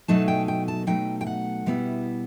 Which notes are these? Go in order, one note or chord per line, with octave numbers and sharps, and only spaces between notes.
B2 F#3 A3 D#4 A5
G5
G5
A5
B2 F#3 A3 D#4 G5
G5
F#5
B2 G3 B3 E4